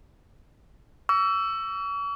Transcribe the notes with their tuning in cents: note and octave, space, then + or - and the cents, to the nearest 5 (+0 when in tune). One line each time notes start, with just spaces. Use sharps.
C#6 +45 E6 +15